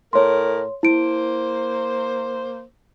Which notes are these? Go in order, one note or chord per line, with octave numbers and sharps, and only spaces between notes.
A2 A#4 C#5 C6
A#3 E4 C5 D7